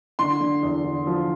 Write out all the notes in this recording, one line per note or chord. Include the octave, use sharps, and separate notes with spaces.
D3 C6
D3
E2
D3
F3